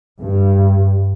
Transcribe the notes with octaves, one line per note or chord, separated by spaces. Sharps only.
G2